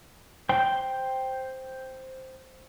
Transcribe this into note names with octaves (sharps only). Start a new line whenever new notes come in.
C5 G5